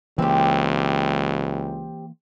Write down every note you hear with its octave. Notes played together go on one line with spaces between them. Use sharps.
C#2 E3 A#3 C4 G4